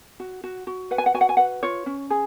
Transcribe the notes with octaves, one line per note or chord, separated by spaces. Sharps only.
F#4
F#4
F#4
B4 F#5
G#5
F#5
F#4 G#5
F#5
G#5
B4 F#5
F4 C#5
C#4
G#4